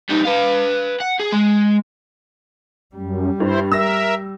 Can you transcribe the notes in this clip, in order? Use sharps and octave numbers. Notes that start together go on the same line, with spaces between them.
G3 D#4
B4 F5
F#5
G#4
G#3
F#2 G3
G2 E4 C5
A#4 E5 E6 A#6